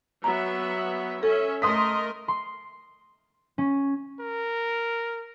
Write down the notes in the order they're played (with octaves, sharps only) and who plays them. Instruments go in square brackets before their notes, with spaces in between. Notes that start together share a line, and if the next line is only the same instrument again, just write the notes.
[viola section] F#3 B3 E5 [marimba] A#5
[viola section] C#4 E5 [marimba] A4
[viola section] A3 A#4 D#5 [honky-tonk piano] C6 D#6 B6
[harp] C6
C#4
[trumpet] A#4